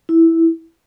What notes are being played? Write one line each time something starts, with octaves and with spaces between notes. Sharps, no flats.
E4